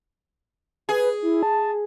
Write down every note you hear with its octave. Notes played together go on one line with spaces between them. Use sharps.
G#4 B4
E4
A5